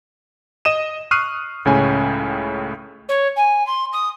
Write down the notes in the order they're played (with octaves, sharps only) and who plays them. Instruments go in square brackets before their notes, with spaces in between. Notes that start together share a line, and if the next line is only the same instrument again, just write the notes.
[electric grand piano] D#5 D#6 D#7 E7
C#6 D#6 F6 F#6 C7 D#7
C#2 A2 C#3 C#4 G#5
[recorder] C#5
G#5
C6
D#6